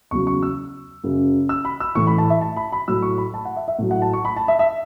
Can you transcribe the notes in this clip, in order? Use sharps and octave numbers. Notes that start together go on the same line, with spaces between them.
E2 C#3 F#3 C#6
C#6
E6
F#2 C#3 F#3
E6
B5
E6
A2 E3 C#6
B5
A5
E5
A5
B5
B5
A2 F#3 E6
C#6
B5
A5
F#5
E5
E5
A2 F#3
F#5
A5
C#6
B5
A5
E5
E5